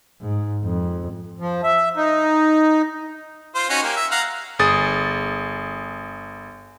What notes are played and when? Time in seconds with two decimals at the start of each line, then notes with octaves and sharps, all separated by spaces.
0.21 G#2
0.64 F2
1.40 F3
1.64 E5
1.97 D#4
3.55 F4 C5
3.70 C#4 D#4 F#4
3.83 A#3 G4
3.96 E5
4.11 F5 F#5 A#5
4.59 G1 G#4 D#6 A6